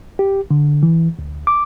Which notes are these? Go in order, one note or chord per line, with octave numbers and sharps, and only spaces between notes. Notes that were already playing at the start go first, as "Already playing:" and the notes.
G4
D3
E3
D2
D6